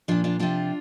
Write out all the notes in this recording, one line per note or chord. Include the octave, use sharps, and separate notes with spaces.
A#2 F3 D4 F4
D4 F4
C3 F3 D4 F4